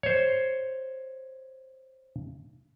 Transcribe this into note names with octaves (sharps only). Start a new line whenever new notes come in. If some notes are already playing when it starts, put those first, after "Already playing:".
C5 C#5